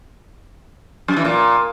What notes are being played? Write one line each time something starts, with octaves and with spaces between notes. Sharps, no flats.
F#2
E3
A#2